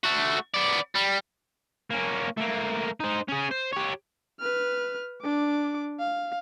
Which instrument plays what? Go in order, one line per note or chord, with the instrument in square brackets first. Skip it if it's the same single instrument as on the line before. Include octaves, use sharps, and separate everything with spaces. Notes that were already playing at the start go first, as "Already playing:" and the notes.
[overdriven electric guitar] A3 F#4
B3 D5
G3
[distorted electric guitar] A#3 C#4
A3 A#3
D#4 C5
C#4 G#4
C5
G4 C#5
[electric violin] B4 F6
D4 D6
F5